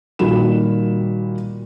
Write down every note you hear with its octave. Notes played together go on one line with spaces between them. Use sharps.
A#2 D#3 G3 F#4 B5 E7